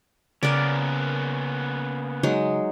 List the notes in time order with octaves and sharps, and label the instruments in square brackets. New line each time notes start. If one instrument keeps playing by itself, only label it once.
[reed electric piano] C#3 [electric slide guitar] A#3 B3 C#4 [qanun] A#4 D5
[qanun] F#3 G#3 D#4